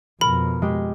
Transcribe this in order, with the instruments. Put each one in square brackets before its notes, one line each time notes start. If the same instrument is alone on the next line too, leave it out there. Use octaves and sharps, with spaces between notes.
[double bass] F2 B2 [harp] A#4 [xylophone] B5
[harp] G#3 G4